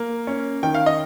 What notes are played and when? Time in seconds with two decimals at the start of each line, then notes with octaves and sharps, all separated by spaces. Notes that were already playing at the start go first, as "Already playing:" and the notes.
Already playing: A#3
0.27 C#4
0.63 D#3 G5
0.74 F5
0.86 D#5